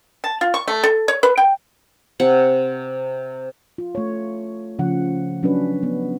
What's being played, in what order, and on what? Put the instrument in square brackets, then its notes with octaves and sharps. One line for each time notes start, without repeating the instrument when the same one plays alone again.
[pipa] A5
F4
C#6
A3
A4
C#5
B4
G5
[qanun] C3 F#5
[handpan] F4
A3 C#5
C#3 F3 F#5
F#3 C#4 D4 B4
B3